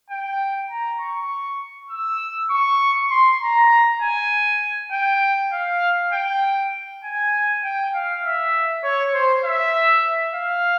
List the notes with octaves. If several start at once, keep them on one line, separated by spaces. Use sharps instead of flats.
G5
A#5
C#6
E6
C#6
C6
A#5
G#5
G5
F5
G5
G#5
G5
F5
E5
C#5
C5
E5
F5